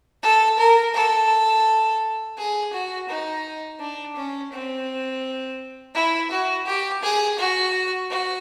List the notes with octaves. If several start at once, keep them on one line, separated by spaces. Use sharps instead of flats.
A4
A#4
A4
G#4
F#4
D#4
D4
C#4
C4
E4
F#4
G4
G#4
F#4
F#4